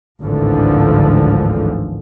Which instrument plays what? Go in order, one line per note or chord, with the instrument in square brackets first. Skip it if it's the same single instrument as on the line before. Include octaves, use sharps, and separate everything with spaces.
[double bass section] G#1 D2 A2 D3 E3 F3